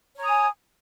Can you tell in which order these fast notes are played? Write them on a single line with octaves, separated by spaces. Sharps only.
C#5 A#5 D#6 G#5